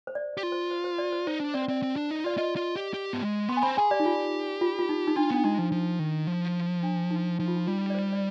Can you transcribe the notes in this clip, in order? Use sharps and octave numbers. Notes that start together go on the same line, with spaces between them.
C5
D5
G4 D5
F4
C5
C5
C5
D5
C5
D#4 C5
D4
C4 D5
C5
C4 D5
C4
D4
D#4
F4 D5
F4 D#5
F4
G4
G4
B3
G#3
B3 C6
G#5
C4 B5
G#4 G#5
G4 D5
D#4
F4
F4
F4
D#4
D#4
D4 F4
B3 D4
G#3 D#4
F3
F3
D#3
F3
D4
D#4
F3 D#4
F4
D#4
G3 F4
D5
C5
D5